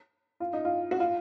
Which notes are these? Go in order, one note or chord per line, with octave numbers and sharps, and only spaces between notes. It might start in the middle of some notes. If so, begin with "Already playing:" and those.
F4
D#4
F4
F#4
F4